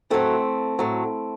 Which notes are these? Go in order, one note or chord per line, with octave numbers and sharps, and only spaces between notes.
A2 F#3 A3 C4
A2 F#3